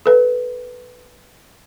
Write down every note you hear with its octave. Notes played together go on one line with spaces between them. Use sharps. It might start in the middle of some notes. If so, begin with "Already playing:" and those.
A4 B4